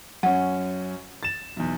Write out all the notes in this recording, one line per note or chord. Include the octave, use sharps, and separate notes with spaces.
F#2 C#4 F#5
A6 E7
B1 E2